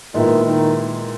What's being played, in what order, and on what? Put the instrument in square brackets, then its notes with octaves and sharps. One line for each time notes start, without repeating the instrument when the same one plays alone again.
[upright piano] A#2 G#3 B3 E4 [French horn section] D#3
[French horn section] D#3